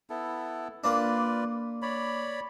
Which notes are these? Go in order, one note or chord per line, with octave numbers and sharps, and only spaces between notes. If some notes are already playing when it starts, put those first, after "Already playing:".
B3 E4 A4
A#3 D4 F4 B4 D5
C#5 D5 B5